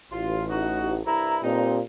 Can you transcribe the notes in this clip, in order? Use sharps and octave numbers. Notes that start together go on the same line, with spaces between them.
A1 F4
D#4 F#4
C2 G2 E4 A#5
G2 A#2 C4 D#4 G4